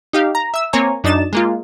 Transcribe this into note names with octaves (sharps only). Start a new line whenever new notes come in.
D#4 G4 F5
A#5
E5 E6
A#3 C4 C#5 G#5 A#5
F#2 D4 D#4 A6 E7
G#3 A#3 F4